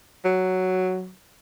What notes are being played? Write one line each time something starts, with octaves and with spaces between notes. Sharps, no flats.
F#3